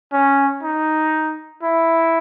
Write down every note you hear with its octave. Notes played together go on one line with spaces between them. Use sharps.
C#4
D#4
E4